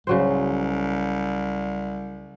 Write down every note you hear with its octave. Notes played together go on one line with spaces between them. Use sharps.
C2 C#3 F#3 C5